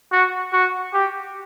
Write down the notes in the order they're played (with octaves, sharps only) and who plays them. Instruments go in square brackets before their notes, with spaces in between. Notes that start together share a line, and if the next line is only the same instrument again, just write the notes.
[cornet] F#4
F#4
G4